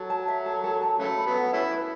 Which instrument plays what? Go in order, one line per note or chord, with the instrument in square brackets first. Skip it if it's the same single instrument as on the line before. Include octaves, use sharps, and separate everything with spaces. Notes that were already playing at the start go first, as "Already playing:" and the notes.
Already playing: [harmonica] F#3 [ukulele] A4
[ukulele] A5
E5
A4
A4
A5
[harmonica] C#3 F#3 A3 [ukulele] B4
[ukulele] B5
[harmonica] F#3 B3
[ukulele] F#5
[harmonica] A3 C#4 E4 [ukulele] B4
[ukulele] B4